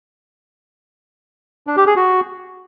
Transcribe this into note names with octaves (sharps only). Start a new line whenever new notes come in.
D4
G4
G#4
F#4